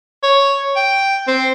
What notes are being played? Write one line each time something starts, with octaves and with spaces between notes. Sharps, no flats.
C#5
G5
C4